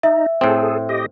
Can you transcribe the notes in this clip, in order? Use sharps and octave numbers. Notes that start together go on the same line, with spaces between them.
D#4 E5
A2 C4 G#4 A4
G4 D#5